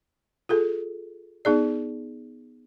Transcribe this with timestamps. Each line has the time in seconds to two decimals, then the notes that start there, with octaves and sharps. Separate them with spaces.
0.49 F4 G#4 A4
1.45 B3 D#4 G#4 D5